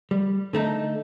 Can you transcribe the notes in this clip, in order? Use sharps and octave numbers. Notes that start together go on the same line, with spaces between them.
G3
D3 A3 D#4 A4